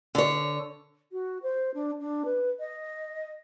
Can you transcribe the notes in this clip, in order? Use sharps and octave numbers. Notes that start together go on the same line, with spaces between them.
D3 C#5
F#4
C5
D4
D4
B4
D#5